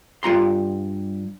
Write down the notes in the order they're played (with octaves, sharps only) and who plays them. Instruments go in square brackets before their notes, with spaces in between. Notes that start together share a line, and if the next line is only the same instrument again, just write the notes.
[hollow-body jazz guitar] G2 F4 A#5 C6